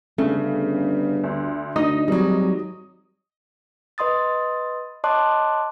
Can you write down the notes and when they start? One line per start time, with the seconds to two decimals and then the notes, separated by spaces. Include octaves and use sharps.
0.18 G1 C#3 A3
1.24 D2
1.76 D2 D#4 D#5 D#6
2.08 G#1 F#3 G3
3.98 B4 D#5 C6 D#6 A6
5.04 C#5 D#5 A5 C6 D6 F#6